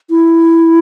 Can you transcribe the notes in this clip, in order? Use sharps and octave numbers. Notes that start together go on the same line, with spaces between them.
E4